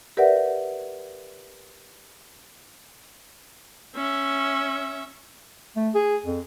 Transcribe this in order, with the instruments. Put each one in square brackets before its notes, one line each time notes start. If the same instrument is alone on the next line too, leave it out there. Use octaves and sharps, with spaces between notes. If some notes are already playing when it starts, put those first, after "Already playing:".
[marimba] G4 A#4 B4 D5 E5 F#5
[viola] C#4 E5
[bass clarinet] A3
G#4
F2